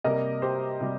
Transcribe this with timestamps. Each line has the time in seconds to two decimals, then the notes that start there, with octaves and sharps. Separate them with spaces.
0.04 C3 G3 A#3 A#4 D#5
0.42 G4 C5
0.81 C3 G3